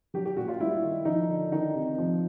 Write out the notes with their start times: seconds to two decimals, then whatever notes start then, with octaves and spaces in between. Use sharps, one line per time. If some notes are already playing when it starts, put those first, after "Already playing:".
0.14 F#3 G4
0.26 G4
0.37 A#2 F#4
0.48 F4
0.60 G3 E4
0.83 D#3
1.05 F3 D#4
1.28 D3
1.52 D#3 D#4
1.75 C3
1.98 F3